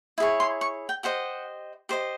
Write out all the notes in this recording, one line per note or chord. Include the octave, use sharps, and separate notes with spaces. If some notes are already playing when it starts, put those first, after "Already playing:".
E4 G#4 C#5
C6
C#6
G5
G4 C5 D#5 F#5
G4 C5 D#5